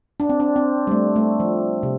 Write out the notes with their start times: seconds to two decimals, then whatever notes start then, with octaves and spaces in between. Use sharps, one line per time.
0.20 D4
0.29 C4
0.40 D4
0.56 C4
0.87 G3
0.91 A3
1.16 A3
1.40 F3
1.83 C3